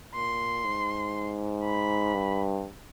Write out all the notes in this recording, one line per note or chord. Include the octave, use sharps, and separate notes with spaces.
A#2 C6
G#2
B5
G2